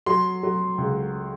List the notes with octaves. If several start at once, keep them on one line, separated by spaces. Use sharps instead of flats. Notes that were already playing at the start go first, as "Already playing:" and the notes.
F#3 C6
F#3
C#2